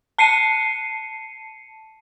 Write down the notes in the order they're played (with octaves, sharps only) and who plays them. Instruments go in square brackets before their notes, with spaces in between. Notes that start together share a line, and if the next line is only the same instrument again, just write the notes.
[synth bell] A5 C7 C#7 D#7